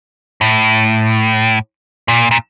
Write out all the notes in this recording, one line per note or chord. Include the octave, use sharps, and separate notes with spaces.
A2
A#2
A#2